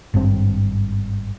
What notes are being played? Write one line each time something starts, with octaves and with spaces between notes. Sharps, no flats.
G#1 G2 C#3 C4